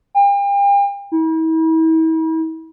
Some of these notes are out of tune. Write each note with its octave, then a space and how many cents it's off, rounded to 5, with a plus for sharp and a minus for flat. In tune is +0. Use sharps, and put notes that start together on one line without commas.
G5 +40
E4 -40